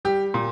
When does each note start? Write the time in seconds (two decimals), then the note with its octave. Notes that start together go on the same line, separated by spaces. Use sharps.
0.05 G3 G4
0.34 A#2